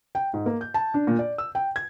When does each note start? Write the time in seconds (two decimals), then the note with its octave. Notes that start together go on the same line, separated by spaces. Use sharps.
0.15 G5
0.34 G#2
0.46 A#3
0.61 G6
0.74 A5
0.94 D4
1.07 A#2
1.19 D5
1.38 E6
1.55 G5
1.76 G#6